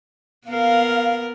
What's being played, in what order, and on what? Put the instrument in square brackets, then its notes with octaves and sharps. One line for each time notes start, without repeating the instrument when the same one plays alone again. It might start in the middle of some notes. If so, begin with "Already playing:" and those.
[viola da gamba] B3 A#4 [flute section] F5